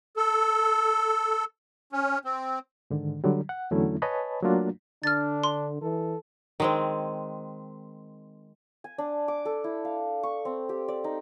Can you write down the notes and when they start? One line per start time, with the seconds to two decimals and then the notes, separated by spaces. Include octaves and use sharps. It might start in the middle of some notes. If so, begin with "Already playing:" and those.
0.16 A4
1.92 C#4
2.25 C4
2.90 G#2 D3 D#3
3.24 D3 F#3 G3
3.49 F#5
3.71 E2 D3 F#3 A3 C#4 E4
4.02 B4 C#5 D#5 G#5 A5 B5
4.42 F#3 A3 A#3 D4 F4 F#4
5.03 D3 D4 F6 A6
5.44 C6
5.82 E3 A4
6.60 D#3 G#3 C4
8.84 G#5
8.98 D4
9.28 D6
9.45 A4
9.64 E4
9.85 F5
10.23 C#6
10.45 C4
10.69 G4
10.88 D5
11.04 D#4